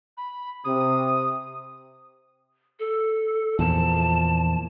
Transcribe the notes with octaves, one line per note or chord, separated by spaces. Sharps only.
B5
C3 D#6
A4
E2 A#2 F3 A5